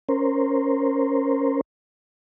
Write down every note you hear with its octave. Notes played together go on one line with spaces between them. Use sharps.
C#4 A#4 C5